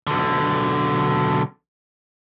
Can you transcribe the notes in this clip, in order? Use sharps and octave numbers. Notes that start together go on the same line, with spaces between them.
B1 D3